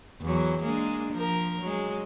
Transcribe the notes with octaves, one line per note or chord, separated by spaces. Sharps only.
E2 F#3
G#3 A#3 D4
F3 A#4
F#3 G#3